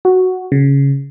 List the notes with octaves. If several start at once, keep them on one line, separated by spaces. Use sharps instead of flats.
F#4
C#3